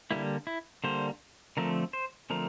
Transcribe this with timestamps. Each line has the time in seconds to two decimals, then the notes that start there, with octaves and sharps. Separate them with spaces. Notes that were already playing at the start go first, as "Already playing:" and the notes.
0.11 D3 G3 A#3 E4
0.47 E4
0.84 D3 G3 A#3 C5
1.57 D3 F3 A3 C4 A#4
1.93 C5
2.30 D3 F3 A3 C4 A#4